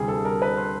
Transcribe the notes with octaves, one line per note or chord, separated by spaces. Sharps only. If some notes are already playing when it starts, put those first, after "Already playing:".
Already playing: D2 C3 E3 G3 G#4
A4
A#4
B4
C5